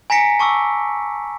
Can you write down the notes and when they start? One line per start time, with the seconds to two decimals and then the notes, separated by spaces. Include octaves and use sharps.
0.10 G#5 A#5 A#6 B6 C#7 D7
0.39 A5 C#6 D6 E6